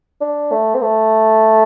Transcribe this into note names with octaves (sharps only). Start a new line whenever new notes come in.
D4
A3
C4
A3